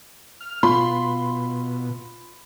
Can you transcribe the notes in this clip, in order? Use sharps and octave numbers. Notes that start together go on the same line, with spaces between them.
F6
B2 F4 B5 C6